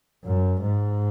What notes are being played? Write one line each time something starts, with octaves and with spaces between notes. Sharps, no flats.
F#2
G#2